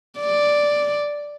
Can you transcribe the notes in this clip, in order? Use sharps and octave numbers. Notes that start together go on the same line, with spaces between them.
D5